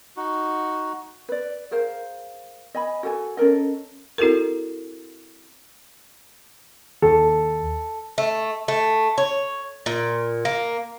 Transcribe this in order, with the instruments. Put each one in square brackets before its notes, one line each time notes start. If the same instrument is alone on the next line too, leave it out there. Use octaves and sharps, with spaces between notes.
[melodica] D#4 F#4
[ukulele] B4 D5
G#4 A#4 C5 F5
D#5 G#5 B5
F#4 A4 G#5
C#4 A4 A#4 D#5
[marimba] C4 E4 F#4 A4 A#4
[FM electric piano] D#2 [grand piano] A4
[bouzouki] A3
A3
C#5
A#2
A#3